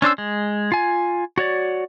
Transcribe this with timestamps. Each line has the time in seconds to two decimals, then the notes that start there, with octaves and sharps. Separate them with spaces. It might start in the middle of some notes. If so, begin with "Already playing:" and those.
0.02 C#4 D4 C5 E6
0.18 G#3
0.72 F4 G#5
1.38 F#4 C#5 D5